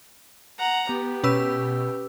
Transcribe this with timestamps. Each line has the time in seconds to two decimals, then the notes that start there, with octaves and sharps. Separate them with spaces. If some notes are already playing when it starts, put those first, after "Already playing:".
0.58 F#5 A#5
0.89 B3 G4
1.24 B2 C#4 B4 E6